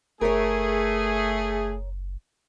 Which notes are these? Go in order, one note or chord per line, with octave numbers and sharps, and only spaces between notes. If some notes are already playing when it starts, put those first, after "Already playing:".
F#1 A3 G#4 A#4 C#5